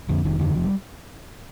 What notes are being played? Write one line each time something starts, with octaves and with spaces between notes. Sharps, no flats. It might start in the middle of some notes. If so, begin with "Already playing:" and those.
F2 D3
F1 D#3
F2 D3 D#3
F1 F3
G3